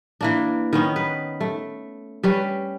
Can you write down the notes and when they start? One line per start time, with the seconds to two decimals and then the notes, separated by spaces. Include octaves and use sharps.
0.21 E3 A#3 D4
0.73 D#3 B3 C#4
0.96 B4
1.41 A3
2.23 G3 C#4 B4